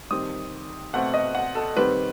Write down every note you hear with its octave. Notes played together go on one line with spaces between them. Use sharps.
D#3 G3 C4 D#6
B2 A3 C4 F#5
D#5
F#5
A4
D#3 G3 C4 B4